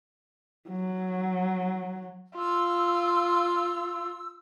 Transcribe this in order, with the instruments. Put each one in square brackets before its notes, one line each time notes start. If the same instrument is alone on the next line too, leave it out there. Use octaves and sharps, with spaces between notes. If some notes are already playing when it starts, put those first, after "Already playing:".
[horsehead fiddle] F#3
[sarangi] F4 [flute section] E6